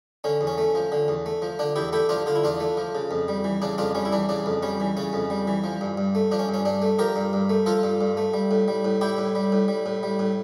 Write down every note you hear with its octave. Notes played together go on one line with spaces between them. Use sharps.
D3 C#4
E2
C#4
A3
F3
D3
E2
A3
F3
D3 D4
E2 E4 G4
A3 E4 G4
F3 D4 F4
D3 F4
E4
E2 D4 F4
A3
F3
C#3
F2
G3
E3
C#3 D4
F2 D4 F4
G3 C#4
E4
E3 D4
C#3 D4
F2
G3 C#4
E3
C#3 C#4
F2
G3
E3
F3
G2
G2
A3
F3 D4
C#4
G2
C#4
G2 D4
A3
F3 G4 A#4
G2
G2
A3
F3 F4 A4
G2
G2
A3
G3
A2
G3
A2
G3 E4 G4
A2
G3
A2
G3
A2
G3
A2